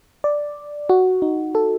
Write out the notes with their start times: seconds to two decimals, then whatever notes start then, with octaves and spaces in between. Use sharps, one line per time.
0.24 D5
0.89 F#4
1.22 D#4
1.55 A4